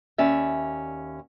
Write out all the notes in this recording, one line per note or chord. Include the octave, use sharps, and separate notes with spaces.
D#2 C#4 D5 E5